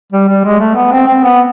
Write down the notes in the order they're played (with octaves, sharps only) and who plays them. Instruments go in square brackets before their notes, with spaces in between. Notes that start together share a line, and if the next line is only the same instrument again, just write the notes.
[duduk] G3
G3
G#3
A3
B3
C4
C4
B3